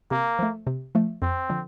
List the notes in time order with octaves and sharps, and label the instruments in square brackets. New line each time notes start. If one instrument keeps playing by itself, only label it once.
[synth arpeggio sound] C3 [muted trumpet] A#3
[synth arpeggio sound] F3 A3
C3
F3 A3
[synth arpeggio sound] F2 [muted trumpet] C4
[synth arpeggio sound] D3 F3